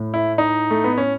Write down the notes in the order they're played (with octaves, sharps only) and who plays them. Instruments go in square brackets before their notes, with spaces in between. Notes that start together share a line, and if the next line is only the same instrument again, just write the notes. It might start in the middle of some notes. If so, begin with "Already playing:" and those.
Already playing: [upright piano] A2
[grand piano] E4
D#4
A3
B3
C#4